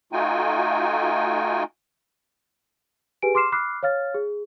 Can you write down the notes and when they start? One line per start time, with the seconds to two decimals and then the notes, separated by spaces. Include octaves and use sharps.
0.12 A3 D#4 F4 F#4 G5 G#5
3.22 G4 G#4 B4 G#5 D7
3.35 C6 D6 F6 C7 E7
3.52 B5 D6 F6 F#6 C7
3.83 C#5 F5 F6 A6
4.14 G#4